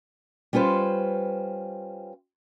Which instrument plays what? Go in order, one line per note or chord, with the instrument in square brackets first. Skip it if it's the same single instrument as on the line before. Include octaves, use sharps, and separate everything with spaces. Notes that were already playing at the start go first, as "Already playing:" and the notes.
[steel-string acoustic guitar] G3 C#4 F4 B4 C5